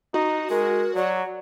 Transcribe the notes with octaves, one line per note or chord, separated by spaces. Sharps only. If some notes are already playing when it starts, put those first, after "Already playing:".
D#4 F#4
G#3 A#4
F#3 D5